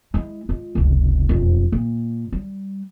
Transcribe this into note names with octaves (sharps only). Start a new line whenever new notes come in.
G#3 E4
G#3 F4
F1 C#2
E1 F2
A#2
G3